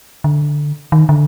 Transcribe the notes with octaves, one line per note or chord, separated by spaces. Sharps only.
D3
D#3
D3